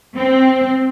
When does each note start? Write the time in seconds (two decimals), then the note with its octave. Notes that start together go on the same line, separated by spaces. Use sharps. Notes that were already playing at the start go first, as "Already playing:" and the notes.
0.16 C4